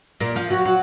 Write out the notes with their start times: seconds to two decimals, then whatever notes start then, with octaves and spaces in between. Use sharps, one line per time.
0.20 A#2 A#3
0.35 F3 F4
0.50 F#3 F#4
0.65 F#3 F#4